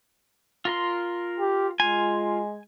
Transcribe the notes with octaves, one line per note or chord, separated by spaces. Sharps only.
F4 A#4 C6
G4
G#3 F4 G#5